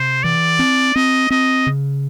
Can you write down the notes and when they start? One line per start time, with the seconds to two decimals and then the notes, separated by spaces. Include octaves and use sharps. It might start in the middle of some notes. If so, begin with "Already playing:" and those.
Already playing: C3 C5
0.23 E3 D5
0.59 C4
0.95 C4 D#5
1.30 C4 D#5
1.67 C#3